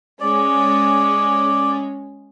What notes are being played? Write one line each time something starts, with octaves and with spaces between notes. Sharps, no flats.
G#3 C#4 D5